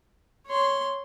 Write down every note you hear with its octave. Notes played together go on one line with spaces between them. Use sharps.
C#5 C6